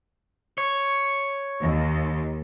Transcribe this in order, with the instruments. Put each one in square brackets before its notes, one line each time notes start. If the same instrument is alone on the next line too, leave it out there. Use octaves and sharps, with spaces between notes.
[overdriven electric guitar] C#5
[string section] D#2